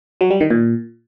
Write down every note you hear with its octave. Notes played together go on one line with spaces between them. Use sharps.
F#3
G3
D#3
A#2